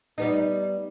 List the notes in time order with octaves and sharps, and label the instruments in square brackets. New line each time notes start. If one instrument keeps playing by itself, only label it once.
[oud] G3 B3 D#4